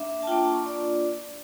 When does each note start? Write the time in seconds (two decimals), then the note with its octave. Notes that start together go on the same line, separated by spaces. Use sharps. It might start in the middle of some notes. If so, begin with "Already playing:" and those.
Already playing: A#3 D4 E5
0.23 A5
0.27 A#3 D4 F4 G5
0.40 A5
0.53 C#6
0.66 D5